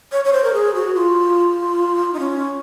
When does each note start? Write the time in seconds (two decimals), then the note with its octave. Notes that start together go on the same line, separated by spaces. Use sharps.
0.12 C#5
0.25 C#5
0.33 C5
0.44 A#4
0.53 G#4
0.75 F#4
0.95 F4
2.14 D#4
2.19 C#4